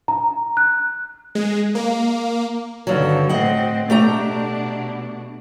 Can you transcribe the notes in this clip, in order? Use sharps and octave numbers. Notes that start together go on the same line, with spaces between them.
A#5
F#6
G#3
A#3
G2 D3 D#3 F#3
A2 C4 D#5 F#5
B2 A3 D4 G4 A#5